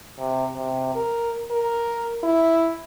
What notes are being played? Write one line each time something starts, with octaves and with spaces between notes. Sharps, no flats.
C3
C3
A#4
A#4
E4